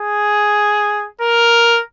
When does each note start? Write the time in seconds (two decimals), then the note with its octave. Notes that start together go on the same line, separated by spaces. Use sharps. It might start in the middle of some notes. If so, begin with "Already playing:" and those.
Already playing: G#4
1.21 A#4